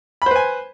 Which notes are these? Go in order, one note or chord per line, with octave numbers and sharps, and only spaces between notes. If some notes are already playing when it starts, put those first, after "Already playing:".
B4 C5 G#5 B5